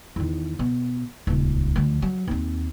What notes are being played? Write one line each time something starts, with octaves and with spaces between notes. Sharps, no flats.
E2 D#3
B2
D#1 C#2
D2 F3
F#3
D#2 C4